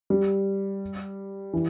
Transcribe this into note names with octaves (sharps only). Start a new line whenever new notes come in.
G3
E3